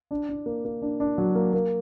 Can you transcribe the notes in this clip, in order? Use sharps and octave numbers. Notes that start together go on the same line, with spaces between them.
D4
D4
A#3
A#3
D4
D4
F#3
A#3
A#3